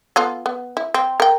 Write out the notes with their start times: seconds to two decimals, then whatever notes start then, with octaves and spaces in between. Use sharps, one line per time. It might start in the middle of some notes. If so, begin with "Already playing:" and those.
0.16 B3 F4 A4
0.46 B3
0.77 E4
0.94 C4
1.20 A#4 G5